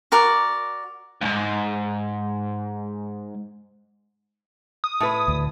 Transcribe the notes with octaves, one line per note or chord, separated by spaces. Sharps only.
F#4 A#4 D5
C#2 G#2
D#6
A2 B4
D2